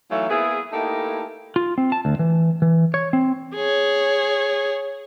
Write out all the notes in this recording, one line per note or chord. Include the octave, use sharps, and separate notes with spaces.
E3 F#3 A3 D#4 E5 F5
A#3 B3 E4 G#4
A3 A#3 D#4 E4 G4 A4
F4
C4
A5
D2
E3
E3
C#5
C4
G#4 C#5